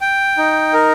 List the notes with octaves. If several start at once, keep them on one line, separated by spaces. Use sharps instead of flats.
G5
D#4
A#4